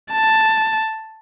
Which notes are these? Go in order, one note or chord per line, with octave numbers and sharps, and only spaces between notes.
A5